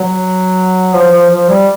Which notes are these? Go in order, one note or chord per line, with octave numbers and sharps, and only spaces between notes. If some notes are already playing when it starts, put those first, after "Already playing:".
Already playing: F#3
F3
F3
F3
G3